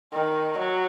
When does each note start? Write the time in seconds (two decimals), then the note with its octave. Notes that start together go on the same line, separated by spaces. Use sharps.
0.13 D#3
0.58 F#3